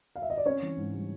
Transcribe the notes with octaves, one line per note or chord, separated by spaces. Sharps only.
F5
E5
D#5
D5
C4 C#4 C#5
E3
G#2
G3